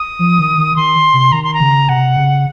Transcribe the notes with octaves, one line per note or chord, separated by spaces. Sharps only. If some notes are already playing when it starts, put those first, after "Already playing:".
Already playing: D#6
F3
D#3
D#3
D#3 C6
C3
D#3 A#5
C6
A#5
C#3
C3 F#5
C#3